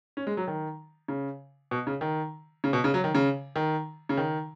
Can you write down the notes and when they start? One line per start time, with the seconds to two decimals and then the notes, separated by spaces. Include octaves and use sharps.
0.17 C#4
0.27 G#3
0.37 F#3
0.47 D#3
1.08 C#3
1.71 B2
1.87 C#3
2.01 D#3
2.64 C#3
2.73 B2
2.84 C#3
2.94 F#3
3.04 D#3
3.15 C#3
3.56 D#3
4.09 C#3
4.17 D#3